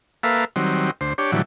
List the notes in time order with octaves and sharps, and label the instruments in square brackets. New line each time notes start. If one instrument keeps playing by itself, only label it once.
[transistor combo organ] A#3 A4 B4 E5 F5
D#3 F#3 G3 C4
D2 C5
D4 G4 C#5
A2 D3 E3 F#3 G3